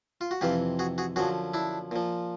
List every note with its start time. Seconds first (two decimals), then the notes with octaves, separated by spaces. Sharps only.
0.21 F4
0.31 F#4
0.41 F2 C3 E3 F4 G4
0.79 F#4 G#4
0.98 F#4 G#4
1.16 F#2 D3 F3 F#4 G#4
1.54 D4 E4
1.91 A#2 F3